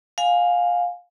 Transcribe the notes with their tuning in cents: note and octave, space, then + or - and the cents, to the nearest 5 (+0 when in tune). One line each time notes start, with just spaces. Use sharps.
F5 +20 G#5 +0